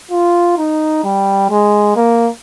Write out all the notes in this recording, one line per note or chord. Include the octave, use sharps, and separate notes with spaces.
F4
D#4
G3
G#3
A#3